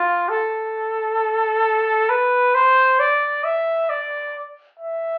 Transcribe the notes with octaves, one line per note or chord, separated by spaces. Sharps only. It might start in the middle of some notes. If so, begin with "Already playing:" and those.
Already playing: F4
A4
B4
C5
D5
E5
D5
E5